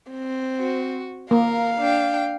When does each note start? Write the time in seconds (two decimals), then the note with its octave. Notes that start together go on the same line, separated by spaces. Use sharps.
0.11 C4
0.59 F#4
1.31 A#3 A#4 F5
1.79 D4 G5